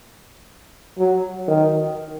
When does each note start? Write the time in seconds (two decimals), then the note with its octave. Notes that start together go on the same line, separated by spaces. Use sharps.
0.98 F#3
1.48 D#3